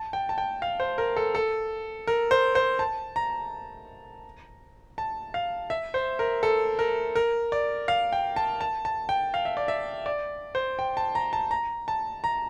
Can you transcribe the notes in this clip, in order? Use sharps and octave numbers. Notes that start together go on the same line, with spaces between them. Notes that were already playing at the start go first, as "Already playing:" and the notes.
Already playing: A5
G5
A5
G5
F5
C5
A#4
A4
A4
A#4
C5
C5
A5
A#5
A5
F5
E5
C5
A#4
A4
A#4
A#4
D5
F5
G5
A5
A5
A5
G5
F5
E5
D5
E5
D5
C5
G5
A5
A#5
A5
A#5
A5
A#5